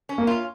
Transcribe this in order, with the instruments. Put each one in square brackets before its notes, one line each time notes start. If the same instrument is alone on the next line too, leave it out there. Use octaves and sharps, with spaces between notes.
[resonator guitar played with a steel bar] C#4
[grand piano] A#3
[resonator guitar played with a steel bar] F4